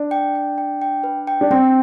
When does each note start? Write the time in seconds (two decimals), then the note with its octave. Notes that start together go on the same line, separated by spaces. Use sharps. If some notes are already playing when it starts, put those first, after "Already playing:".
Already playing: D4
0.11 G5
0.35 G5
0.58 G5
0.82 G5
1.04 B4
1.27 G5
1.41 D4
1.51 C4 G5